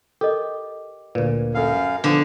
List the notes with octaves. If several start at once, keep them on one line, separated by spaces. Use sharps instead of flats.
G4 A4 A#4 D#5
D2 A#2 B4
F#2 A4 A#4 F5
D3 F3 B3